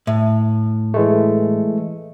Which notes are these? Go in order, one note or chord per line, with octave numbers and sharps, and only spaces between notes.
A2
E3 G#3 A3